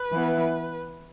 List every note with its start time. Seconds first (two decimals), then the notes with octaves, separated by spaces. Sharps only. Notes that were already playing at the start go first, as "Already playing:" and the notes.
Already playing: B4
0.13 E3 B3 E4